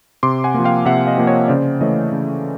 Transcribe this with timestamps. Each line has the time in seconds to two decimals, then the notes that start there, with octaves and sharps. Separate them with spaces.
0.23 C3 C6 D6
0.44 F#5 G#5
0.54 F3 A#3
0.64 F5 G5
0.85 C3 E5 F#5
1.07 D#5 F5
1.18 F3 A#3
1.27 C#5 D#5
1.48 C#3 C5 D5
1.81 E3 A3 C#5 D#5
2.12 C#3